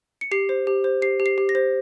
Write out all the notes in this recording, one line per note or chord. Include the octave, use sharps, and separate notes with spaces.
C#7
G4 C7
C5
G4
C5
G4 C7
G4
C7
G4
A#6
C5